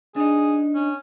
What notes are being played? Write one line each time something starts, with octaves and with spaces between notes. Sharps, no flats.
D4 D#4 G#4
C#4